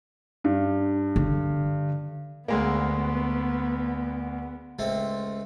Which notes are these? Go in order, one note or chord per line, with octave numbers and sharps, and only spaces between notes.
G2
D3
D2 G#3 A#3 B3
C#2 A3 C4